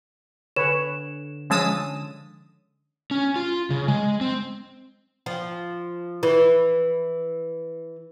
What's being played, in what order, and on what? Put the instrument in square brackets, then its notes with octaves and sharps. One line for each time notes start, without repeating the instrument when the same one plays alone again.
[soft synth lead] D3 [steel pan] B4 C#5 [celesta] E7
[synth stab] F3 G#3 D#6 [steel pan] C#4 A5 E6
[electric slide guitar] C#4
F4
C#3
G#3
C4
[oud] F3
E3